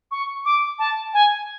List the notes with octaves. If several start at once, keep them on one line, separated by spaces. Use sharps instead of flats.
C#6
D6
A5
G#5